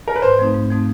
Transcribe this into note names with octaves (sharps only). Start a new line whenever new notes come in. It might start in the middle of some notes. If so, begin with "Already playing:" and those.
A#4
B4
G#2 C5
F3 A3 C4 D#4
G#2
F3 A3 C4 D#4